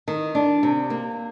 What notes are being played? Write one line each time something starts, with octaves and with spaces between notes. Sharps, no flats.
D#3
D4
C3
A#3